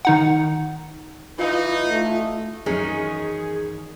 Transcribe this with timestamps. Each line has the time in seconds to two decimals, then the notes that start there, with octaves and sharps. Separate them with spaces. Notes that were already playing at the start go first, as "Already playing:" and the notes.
0.05 D#3 D#4 F#5
1.39 E3 D#4 F4
1.86 A3
2.66 F#2 D#3 E3 G#3 C#4 G#4